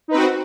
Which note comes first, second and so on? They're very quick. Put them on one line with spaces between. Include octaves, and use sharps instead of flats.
D#4 B4 C4 F#4